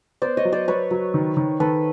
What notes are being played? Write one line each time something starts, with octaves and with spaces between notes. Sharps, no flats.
B3 C5 D5
C#5 D#5
F#3
C5 D5
F#3 B4 C#5
F#3
D#3
D#3
D#3 A4 B4